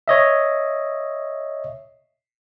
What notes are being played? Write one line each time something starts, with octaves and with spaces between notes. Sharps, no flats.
C#5 D#5 E5